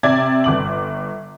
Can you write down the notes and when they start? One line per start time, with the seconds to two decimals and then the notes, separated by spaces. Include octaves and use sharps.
0.03 C3 D5 E5 G#6
0.44 G1 D6 F#7